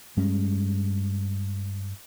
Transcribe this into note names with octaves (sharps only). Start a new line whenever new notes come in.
G2 G3 G#3 C#4